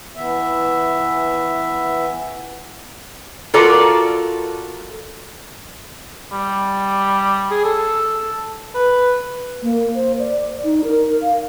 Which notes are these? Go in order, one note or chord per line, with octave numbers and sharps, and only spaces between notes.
E3 B3 E5
F4 F#4 A4 A#4 D5
G3
G#4
A4
B4
A#3
C5
D5
D#4
A#4
F5